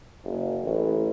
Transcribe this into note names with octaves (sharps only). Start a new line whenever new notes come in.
F#1
A1